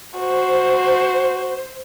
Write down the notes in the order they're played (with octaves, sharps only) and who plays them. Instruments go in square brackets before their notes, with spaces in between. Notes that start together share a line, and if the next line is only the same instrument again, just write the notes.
[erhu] F#4 [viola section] C5